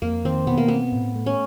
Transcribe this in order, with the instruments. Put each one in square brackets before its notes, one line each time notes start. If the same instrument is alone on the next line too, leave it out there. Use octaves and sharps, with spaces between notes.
[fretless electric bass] F2 [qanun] A#3
[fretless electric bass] D#3 [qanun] C4
[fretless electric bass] B2 [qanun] B3
[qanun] A#3
[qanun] B3 [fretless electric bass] C4
[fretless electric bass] A2
A3
[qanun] C#4